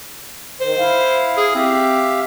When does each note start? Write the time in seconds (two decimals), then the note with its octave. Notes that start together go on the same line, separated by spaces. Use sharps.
0.60 D#3 C5
0.79 E4 F5
1.37 G#4
1.55 C4 G4 E5 F5